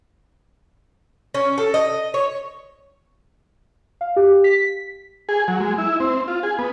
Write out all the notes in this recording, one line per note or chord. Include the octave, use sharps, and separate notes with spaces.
C#4
A4
D#5
C#5
F5
G4
B6
G#4
F#3
G#3
E4
C4
F4
G#4
B3